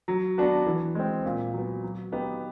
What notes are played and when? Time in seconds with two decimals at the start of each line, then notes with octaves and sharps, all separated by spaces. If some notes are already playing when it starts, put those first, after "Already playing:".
0.08 F#3
0.38 B3 D4 F#4 B4
0.67 E3
0.95 G#3 C4
1.25 A#2
1.54 F#3 B3
1.84 F#3
2.12 B3 D#4 G4